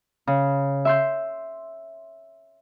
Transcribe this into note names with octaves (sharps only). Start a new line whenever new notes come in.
C#3
E5 C6 G6